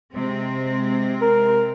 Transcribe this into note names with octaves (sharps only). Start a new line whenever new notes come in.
C3 G#3 C4
A#4